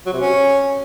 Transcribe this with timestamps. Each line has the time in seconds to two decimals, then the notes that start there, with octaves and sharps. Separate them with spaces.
0.06 F#3
0.13 C3
0.20 C#4